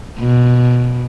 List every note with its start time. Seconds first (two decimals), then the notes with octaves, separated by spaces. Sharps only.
0.18 B2